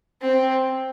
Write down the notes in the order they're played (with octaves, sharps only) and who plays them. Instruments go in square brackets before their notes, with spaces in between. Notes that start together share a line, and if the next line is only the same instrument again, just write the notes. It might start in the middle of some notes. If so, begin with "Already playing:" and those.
[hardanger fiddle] C4